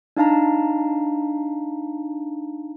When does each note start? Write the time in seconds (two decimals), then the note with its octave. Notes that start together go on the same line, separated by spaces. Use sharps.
0.17 D4 D#4 F5 A5 A#5